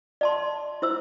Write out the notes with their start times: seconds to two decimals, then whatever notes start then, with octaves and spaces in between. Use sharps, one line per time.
0.21 D5 A5 C6
0.82 E4 C5 E6